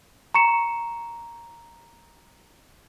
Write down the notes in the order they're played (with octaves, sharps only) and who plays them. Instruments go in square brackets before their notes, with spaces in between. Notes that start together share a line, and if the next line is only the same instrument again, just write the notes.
[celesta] A#5 C#6 C#7 E7